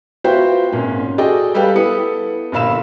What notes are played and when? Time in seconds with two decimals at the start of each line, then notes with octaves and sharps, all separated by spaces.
0.24 B3 F4 F#4 C5 E5 G5
0.72 G#1 A#2 C#4
1.18 F#4 G#4 A4 D5 D#5 G5
1.54 G3 G4 A4 B4 F5 G5
1.75 B3 E4 A4 D#6 C#7
2.52 G1 A#2 F5 B5 E6 E7